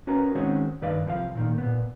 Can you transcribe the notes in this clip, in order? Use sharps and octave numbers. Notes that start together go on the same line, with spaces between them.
C#4 F#4 A#4 B4 A#5
D#3 G#3 C4 C#4 F#4
G2 D#3 B4 D5 F5
C2 F3 C#5 F5
A#2 D#3 A#3
A#2 B3